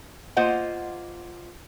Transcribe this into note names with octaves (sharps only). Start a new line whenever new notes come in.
A#3 F4 C5 D#5 F#5